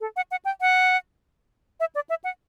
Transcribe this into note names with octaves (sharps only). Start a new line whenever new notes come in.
A4
F#5
F#5
G5
F#5
E5
D5
E5
F#5